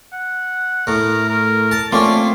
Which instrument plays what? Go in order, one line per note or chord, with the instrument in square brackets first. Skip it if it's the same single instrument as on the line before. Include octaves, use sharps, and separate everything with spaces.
[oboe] F#5
[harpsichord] A2 [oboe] A#4
[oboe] A#4
[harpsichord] A5
[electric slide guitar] A3 C4 F4 [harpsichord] A#3 C#4 [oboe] D5